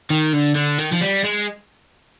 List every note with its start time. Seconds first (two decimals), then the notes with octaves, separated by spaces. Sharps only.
0.10 D#3
0.33 D3
0.55 D3
0.78 D#3
0.92 F3
1.01 G3
1.24 G#3